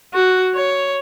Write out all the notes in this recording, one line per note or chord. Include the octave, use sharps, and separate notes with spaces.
F#4
C#5